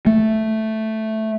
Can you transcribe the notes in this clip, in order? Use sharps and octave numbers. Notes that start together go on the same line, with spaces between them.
A3